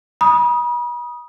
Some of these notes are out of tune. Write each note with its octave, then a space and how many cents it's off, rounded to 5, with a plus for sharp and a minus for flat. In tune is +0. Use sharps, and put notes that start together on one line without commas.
B5 -40 D#6 +0